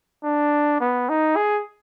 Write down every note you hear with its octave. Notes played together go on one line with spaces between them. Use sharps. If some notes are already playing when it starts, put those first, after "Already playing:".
D4
B3
D#4
G#4